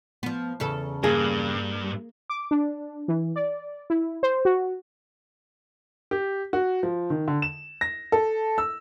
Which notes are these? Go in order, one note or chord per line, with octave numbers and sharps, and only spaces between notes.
F3 B3
E2 C#3 A4
G2 A#3 G#4
D6
D4
E3
D5
E4
C5
F#4
G4
F#4
F3
D#3
D3
E7
A#6
A4
E6